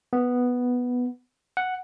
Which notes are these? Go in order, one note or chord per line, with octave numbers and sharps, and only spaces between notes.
B3
F#5